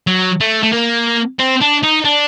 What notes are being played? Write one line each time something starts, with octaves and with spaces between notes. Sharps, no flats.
F#3
A3
A3
A#3
C4
D4
D#4
D4